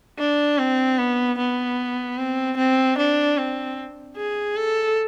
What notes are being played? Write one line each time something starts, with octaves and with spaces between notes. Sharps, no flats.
D4
C4
B3
B3
C4
C4
D4
C4
G#4
A4